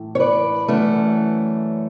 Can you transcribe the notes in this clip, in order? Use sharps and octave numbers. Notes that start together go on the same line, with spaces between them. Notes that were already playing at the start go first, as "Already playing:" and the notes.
Already playing: A2 E3
C#5
B4 D5
F#2 E3 A3 C#4